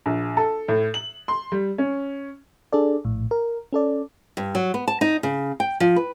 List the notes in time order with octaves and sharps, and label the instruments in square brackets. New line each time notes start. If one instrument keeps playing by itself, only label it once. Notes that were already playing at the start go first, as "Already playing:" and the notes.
[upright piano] A#1
A4
A2
F#7
C6
G3
C#4
[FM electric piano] D4 G#4 A4 D5
A#1 A2
A#4
C#4 A4 D5
[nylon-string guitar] G2
F#3
B3
A5
D#4
C#3
G5
F3
B4